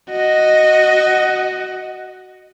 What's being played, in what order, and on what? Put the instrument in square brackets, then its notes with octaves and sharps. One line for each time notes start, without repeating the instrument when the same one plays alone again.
[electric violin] F#4 [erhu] D#5